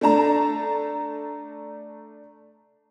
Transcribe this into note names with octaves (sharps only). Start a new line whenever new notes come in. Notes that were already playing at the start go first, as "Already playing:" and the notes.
A3 D4 A5 A#5